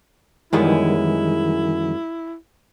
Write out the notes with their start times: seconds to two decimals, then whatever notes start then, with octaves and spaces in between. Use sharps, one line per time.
0.53 F#2 D#3 E3 G3 G#3 B3 E4